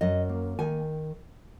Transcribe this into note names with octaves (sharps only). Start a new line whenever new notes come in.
F#2 D#5
A#3
D#3 G#5